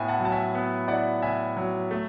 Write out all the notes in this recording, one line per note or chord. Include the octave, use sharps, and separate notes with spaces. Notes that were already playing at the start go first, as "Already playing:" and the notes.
Already playing: A2 B3 E4 E5 G#5
F#5 A5
F#3 A5
E5 G#5
B3
E4 D5 F#5
A2 E5 G#5
F#3
A3